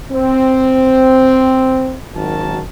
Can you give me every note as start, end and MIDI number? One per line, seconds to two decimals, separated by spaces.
0.12 1.97 60
2.15 2.61 32
2.15 2.61 42
2.15 2.61 51
2.15 2.61 66
2.15 2.61 70
2.15 2.61 81